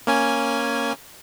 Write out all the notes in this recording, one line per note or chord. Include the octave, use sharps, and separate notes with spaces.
A#3 C#4 G#5